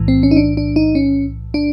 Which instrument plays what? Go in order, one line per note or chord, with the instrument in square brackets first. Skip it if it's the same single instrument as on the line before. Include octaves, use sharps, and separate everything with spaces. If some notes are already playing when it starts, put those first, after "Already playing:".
Already playing: [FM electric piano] B1 A2 E3
C4
C#4
D#4
D4
D4
D#4
C#4
D4